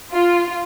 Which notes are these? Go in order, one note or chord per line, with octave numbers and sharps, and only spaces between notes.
F4